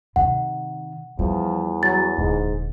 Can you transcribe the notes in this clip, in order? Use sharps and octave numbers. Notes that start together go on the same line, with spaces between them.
C3 D#3 F#5
E2 F3 G3
F#3 A6
D#1 G#2 D3